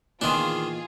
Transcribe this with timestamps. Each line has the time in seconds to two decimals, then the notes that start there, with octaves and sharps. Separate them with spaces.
0.21 A#2 D#3 E3 B3 D4 F4 G#4 C6